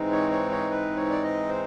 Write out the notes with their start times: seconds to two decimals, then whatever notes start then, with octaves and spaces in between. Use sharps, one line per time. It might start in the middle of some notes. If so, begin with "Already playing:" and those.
Already playing: G#2 E3 G#3 C4 D#4
0.12 C#5
0.31 C#5
0.51 C#5
0.70 B4
0.97 C#5
1.10 D5
1.23 D#5
1.49 C5